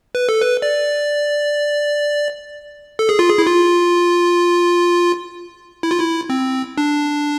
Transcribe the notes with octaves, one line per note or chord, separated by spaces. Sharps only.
B4
A4
B4
D5
A4
G#4
F4
G#4
E4
F4
E4
F4
E4
C4
D4